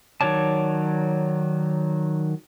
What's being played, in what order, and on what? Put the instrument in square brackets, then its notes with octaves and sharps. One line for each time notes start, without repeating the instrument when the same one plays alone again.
[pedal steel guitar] D#3 F#3 C#5 D5 A5